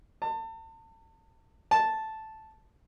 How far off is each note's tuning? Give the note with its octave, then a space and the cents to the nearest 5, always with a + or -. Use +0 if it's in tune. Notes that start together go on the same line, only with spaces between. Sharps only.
A5 +35
A5 -5